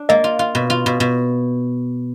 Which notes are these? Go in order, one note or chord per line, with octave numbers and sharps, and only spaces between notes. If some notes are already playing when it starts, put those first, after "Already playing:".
Already playing: D4
A#3 D#5
F4
F4
B2
F4
B2
B2